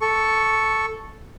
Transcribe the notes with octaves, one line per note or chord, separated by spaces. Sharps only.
A4 C#6